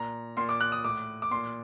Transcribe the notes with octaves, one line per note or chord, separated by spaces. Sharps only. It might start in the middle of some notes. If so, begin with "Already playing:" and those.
Already playing: A#2 A#5
A#2 C6
D6
F#6
D#6
A2 D6
D6
A#2 C6